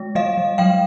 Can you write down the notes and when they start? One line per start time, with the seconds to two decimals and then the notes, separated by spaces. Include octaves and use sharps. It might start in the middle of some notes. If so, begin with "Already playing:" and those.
Already playing: G#3
0.15 G3 D#5 F5
0.37 G3
0.58 F#3 F5 G5